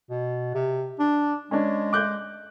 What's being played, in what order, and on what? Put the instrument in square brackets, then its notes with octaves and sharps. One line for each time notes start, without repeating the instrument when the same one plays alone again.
[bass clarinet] B2
C3
D4
[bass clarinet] G#3 [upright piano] C#4 D4
[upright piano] D6 F#6 G6